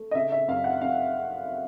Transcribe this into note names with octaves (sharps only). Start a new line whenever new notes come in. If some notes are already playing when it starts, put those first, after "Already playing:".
Already playing: A3
D#5
C#3 E5
E5
F#2 F5
F#5
F#2 F5